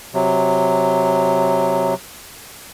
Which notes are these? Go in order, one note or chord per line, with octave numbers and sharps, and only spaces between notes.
C3 F#3